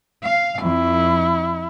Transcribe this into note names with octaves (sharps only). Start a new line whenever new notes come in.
F5
F2 E4